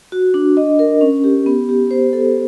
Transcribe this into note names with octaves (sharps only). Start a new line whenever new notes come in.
F#4
D4
D#5
A#4
C#4
G4
B3
G4
C5
A4